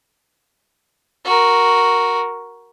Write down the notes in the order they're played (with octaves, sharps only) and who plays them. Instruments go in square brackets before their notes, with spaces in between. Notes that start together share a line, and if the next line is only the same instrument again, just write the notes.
[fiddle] F#4 A#4